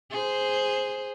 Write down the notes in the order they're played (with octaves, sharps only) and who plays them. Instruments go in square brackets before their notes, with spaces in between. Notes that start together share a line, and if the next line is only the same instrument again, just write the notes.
[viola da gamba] G#4 C5